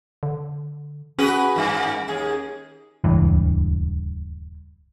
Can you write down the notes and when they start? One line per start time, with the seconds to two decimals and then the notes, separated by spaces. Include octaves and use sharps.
0.23 D3
1.19 C#4 F#4 G#4 B4
1.56 G2 D#3
2.08 D#2 G#4
3.04 D#1 C#2 G2 E3